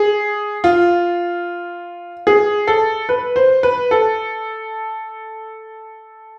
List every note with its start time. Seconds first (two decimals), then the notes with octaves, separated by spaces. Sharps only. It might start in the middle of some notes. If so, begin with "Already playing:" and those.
Already playing: G#4
0.64 F4
2.27 G#4
2.67 A4
3.09 B4
3.36 C5
3.63 B4
3.91 A4